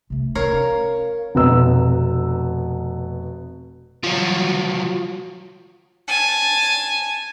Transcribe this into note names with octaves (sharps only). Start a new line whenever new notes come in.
C3 A3
C#4 A#4 C#5 F5
F1 B2 B4 A#5 E6
F3 F#3
G#5 A5